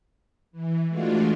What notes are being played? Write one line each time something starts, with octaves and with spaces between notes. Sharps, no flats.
E3
E3 G#3 A3 D4 F4 F#4